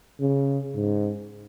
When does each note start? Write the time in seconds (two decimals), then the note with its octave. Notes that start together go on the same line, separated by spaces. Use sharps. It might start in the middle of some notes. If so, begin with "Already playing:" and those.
0.21 C#3
0.76 G#2